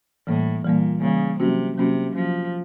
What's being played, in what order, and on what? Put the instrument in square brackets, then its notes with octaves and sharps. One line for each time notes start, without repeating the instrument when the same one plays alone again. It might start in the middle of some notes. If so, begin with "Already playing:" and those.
[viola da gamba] A2 [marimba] E3 G3 A#3
[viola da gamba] A#2 [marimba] E3 G3 A#3
[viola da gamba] C#3 [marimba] E3 G3 A#3
[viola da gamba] C3 [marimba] F#3 A#3 C#4 F#4
[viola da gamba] C3 [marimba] F#3 A#3 C#4 F#4
[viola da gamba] F3 [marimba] F#3 A#3 C#4 F#4